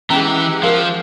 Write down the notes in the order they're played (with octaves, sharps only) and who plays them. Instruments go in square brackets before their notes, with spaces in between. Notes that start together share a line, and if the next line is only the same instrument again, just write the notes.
[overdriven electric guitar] E3 [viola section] G#3 G4 F#5 [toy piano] C#4 A#5
[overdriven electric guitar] F3 [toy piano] A#4 F5